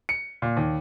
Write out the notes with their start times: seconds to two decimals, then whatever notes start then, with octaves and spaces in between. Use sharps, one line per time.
0.09 C#7
0.42 A#2
0.57 D#2